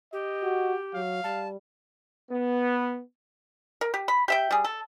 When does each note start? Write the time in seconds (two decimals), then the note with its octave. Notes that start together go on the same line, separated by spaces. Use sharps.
0.13 G4 D#5
0.43 F#4
0.94 F#3 F5
1.24 G3 A5
2.31 B3
3.81 A#4
3.94 G4
4.08 B5
4.28 G4 E5 G5
4.51 G3 G#4
4.65 A4